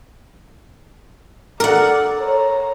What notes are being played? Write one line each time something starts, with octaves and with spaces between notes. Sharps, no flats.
A4 A#4 D5 F#5
C#5 A#5